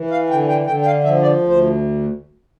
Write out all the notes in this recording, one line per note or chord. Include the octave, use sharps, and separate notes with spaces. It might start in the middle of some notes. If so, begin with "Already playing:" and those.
Already playing: E3
F5
D3 G5
G5
D3 G5
G5
F5
F3 E5
D5
D2
C5